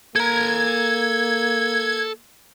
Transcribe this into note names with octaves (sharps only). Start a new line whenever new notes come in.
A#3 A4 A#5 G#6